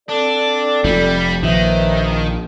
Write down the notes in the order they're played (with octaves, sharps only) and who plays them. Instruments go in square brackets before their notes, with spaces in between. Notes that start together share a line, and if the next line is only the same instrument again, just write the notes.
[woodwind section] C4 A4 D5 [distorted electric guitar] D4
[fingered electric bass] F1 [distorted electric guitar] G3
[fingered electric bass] A#1 [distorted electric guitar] D#3 [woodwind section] B4 C5 E5